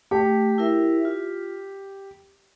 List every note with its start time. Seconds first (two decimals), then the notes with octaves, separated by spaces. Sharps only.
0.11 A3 G4
0.58 E4 A#4 E5
1.05 F4